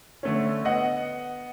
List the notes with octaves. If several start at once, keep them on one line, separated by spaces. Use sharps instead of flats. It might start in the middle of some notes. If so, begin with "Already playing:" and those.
D3 A3 C#4
B3 D#5 F#5